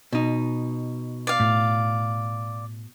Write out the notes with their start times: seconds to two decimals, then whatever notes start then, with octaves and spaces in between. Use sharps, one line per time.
0.13 B2 D#4
1.27 D5 F5
1.40 A2